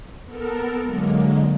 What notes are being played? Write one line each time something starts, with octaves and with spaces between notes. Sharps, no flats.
B3 A4 A#4
D3 F#3 G#3 A#3